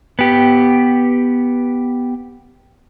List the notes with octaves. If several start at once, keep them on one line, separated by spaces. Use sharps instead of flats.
B3 G4